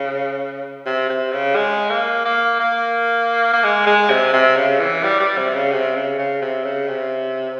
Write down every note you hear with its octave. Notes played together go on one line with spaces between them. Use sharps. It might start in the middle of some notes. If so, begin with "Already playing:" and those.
Already playing: C#3
C3
C3
C#3
G#3
A#3
A#3
A#3
A#3
G#3
G#3
C3
C3
C#3
E3
G3
G3
C3
C#3
C3
C#3
C#3
C3
C#3
C3